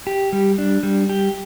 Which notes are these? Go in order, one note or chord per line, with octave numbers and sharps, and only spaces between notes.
G4
G3
D4
G3
G4